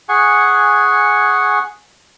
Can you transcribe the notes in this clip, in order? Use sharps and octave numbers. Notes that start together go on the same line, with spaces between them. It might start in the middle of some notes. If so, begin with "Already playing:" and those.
G#4 F#5 G#5 C#6